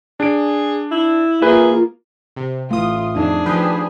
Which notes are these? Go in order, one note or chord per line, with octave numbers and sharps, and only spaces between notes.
D4 G#4 D7
E4
A#3 F4 G#4 B4 E5
C3
A1 A3 F4 D#6
F2 D4 D#4 G#4
F3 G4 B4